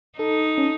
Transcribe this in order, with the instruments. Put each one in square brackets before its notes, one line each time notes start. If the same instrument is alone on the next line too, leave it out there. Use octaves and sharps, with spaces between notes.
[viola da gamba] D#4 [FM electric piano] A4
[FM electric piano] C#4